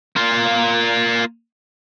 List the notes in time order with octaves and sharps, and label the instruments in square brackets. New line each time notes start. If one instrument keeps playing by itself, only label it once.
[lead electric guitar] A#3 F4